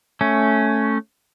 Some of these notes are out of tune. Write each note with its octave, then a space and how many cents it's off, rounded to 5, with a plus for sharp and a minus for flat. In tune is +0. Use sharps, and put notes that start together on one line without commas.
A3 +0 C#4 +0